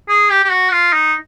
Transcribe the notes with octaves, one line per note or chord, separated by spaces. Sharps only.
G#4
G4
G4
F#4
F4
D#4